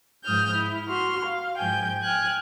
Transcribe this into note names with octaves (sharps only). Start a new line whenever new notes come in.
G#2 F3 D#6 F6 G6
E4
F#4 C6 F6
F5
G#2 F3 G5 G#5 G6
G5 G#5 F6 F#6 G#6